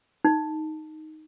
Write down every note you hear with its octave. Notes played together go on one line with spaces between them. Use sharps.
D#4